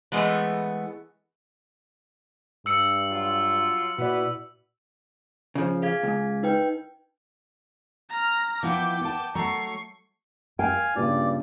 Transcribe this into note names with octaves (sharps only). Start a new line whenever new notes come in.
E3 G#3 A3 B3
G2 E6 C#7
F#3 F4
A#2 B3 E4 F#4 B4 D5
C#3 F3
G#4 F5 G#6
C#2
D#4 B4 G5
A#5 F6
F3 B3 E4 G5 D6
B3 A5
F#3 A3 A#5 C#6 C7
F5 G5 G#5
G2 A#2 C#3 F4 D5